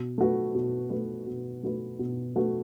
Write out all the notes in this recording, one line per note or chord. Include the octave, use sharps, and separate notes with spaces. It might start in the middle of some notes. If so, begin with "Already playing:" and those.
Already playing: B2
A3 F#4 B4
B2
A3 F#4 B4
B2
A3 F#4 B4
B2
A3 F#4 B4